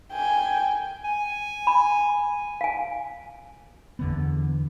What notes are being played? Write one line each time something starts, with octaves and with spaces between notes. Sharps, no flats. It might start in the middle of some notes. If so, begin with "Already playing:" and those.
G5 G#5
G#5
B5
F5 G#5
E2 D3 B3